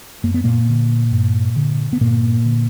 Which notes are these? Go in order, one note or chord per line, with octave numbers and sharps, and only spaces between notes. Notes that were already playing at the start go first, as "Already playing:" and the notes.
F#2 A#3
B3
A#2 A#3
D3
G2
D3
B3
G2 A#2 A#3
D3